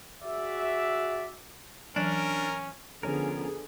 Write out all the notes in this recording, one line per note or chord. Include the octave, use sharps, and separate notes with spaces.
F#4 G#4 D5 E5
E3 F#3 C#4 D4 A#4 D5
D3 F3 B3 C#4 G#4 A#4